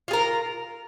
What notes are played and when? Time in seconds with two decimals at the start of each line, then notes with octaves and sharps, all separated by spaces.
0.08 F4
0.11 G#4
0.13 A#4